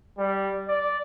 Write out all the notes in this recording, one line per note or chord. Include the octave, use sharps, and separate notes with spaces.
G3
D5